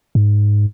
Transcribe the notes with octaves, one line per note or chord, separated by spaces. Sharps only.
G#2